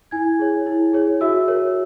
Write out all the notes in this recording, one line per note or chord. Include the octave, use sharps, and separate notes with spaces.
E4 G#5 G#6
G#4 C#5
E4
G#4 C#5
F#4 E5 E6
A#4 C#5